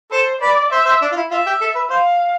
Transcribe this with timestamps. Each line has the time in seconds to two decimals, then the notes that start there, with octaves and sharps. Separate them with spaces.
0.12 A4 C5
0.42 B4 D5
0.71 C5 E5
0.86 C5
1.02 D4
1.12 F4
1.16 E4
1.31 F4 E5
1.46 G4
1.61 A4
1.75 B4
1.90 C5 F5